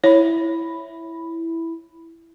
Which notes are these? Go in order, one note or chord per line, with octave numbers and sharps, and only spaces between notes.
E4 C#5 B5